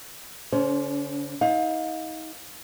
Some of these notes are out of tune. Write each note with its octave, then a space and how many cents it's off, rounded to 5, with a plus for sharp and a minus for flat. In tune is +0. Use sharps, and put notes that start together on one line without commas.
D3 -35 C#4 +35 C5 +0
D#4 +35 F5 +30